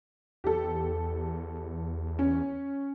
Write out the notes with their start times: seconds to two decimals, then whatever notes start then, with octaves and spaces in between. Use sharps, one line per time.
0.44 E2 G4 A4
2.19 C#4